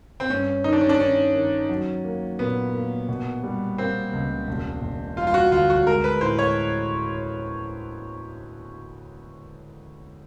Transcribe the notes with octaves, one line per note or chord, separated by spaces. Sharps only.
C4
G2 C#4
D#3 D#4
D4
C#4
D4
D#3 C#4
D#3
F#3
A#3
A#2 B3
A#3
B2
G3
A#3 C4
C#2
E1
E1
G3 F4
F4
F#4
D2 F4
F#4
G#3 A#4
B4
A2 C5
C#5